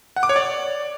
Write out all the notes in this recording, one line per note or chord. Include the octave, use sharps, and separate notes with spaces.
F#5
D6
C#5
D5